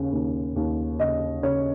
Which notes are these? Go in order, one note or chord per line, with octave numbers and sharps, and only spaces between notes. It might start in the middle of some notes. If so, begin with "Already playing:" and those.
Already playing: D#2 C#3
D#2
D#2
C#3 D#5
C#3 C#5